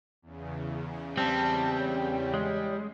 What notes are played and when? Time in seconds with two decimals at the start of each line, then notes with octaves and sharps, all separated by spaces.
0.22 E2 C#3
1.17 G3 C4 A5
1.79 C#5
2.34 G#3